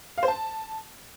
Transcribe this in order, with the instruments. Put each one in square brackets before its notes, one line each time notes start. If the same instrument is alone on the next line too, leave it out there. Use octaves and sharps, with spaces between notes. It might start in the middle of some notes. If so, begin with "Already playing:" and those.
[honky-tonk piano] F5
C5
A5